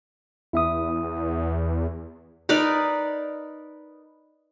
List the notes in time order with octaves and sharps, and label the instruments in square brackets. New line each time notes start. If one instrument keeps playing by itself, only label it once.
[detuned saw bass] E2 [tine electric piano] E4 E5 D#6
[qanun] D#4 A#4 B4 D5